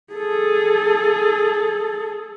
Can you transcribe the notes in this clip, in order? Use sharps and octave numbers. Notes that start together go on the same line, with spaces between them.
G#4 A4